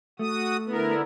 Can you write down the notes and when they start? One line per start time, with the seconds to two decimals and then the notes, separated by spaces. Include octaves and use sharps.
0.19 A3 F#4 D#6
0.69 D3 B3 E4 A#4